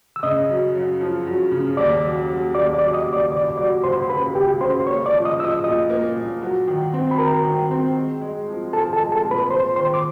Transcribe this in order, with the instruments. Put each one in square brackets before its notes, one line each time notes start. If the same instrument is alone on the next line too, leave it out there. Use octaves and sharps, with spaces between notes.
[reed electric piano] E6
[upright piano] C#3 [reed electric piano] D#5 D#6
[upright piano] F#2
F#2
F3
F#2
C#3
[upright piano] D#2 [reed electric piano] D5 D6
[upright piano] F#3
F#3
[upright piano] D#2 [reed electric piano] D5 D6
[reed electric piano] D5 D6
[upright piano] F#3
[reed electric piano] D6
D#5 D#6
[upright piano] D#2
[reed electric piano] D5 D6
[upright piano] C#2 [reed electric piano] D5 D6
[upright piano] F#3 [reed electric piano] D5 D6
[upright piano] C#2 [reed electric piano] C5 C6
[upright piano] C#3 [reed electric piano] B4 B5
[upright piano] C#2 [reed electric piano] G4 G5
[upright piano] C#3 [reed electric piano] C5 C6
[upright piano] A#3 [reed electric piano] C#5 C#6
[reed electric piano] D5 D6
[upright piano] F3
[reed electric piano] D#5 D#6
[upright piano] F3 [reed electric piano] E6
[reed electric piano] D#5 D#6
[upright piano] A#2 [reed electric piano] D#5 D#6
[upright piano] A#3
A#2
F#3
D#3
C4
[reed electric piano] B5
[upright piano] D#3 [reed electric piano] A#4 A#5
[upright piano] D#3
C4
G#3
G#3
F3
[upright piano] F3 [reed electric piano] A4 A5
[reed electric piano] A4 A5
[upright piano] G#3
[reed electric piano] A4 A5
[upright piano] A#2
[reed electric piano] B4 B5
[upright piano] F4 [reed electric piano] C5 C6
[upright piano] D#3 [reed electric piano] C5 C6
[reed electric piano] D6